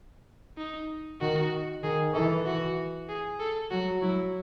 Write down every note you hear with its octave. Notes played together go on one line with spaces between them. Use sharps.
D#4
D#3 F#4
D#3 G#4
E3 A4
F#4
G#4
A4
F#3 F#4
F#3 E4